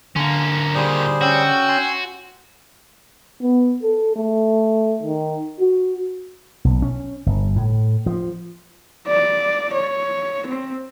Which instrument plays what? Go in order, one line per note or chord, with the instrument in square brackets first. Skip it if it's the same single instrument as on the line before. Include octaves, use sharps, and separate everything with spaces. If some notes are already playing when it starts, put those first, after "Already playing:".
[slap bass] D3 [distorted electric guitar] A#3 C#4
[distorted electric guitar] A#2 D#3 [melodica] G3 G#4 C5
[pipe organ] C#4 G5 E6 [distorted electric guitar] F#4
[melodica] G#5 C6
[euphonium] B3
A4
A3
D#3
F#4
[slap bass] B1
C#4
G1
A2
F3
[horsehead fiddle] D5
C#5
C4